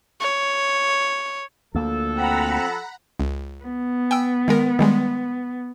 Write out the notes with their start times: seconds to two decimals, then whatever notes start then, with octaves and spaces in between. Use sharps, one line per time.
0.20 C#5
1.75 D2 F3 A#3 A4
2.15 C4 F#5 A#5 B5
3.20 C#2
3.64 B3
4.11 G5 G#5 E6
4.48 D#3 G#3 A#4
4.79 D#3 G3 G#3